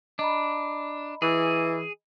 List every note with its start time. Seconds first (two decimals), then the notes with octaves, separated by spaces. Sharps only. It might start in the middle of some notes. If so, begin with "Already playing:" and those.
0.19 D4 D#5 A#5 B5
1.22 E3 G#4